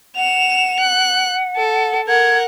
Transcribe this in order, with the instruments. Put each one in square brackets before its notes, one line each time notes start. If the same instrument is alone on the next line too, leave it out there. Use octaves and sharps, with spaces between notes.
[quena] F#5 [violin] E7 F7
[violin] F#6
A4
[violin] A#4 F#5 [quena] G#6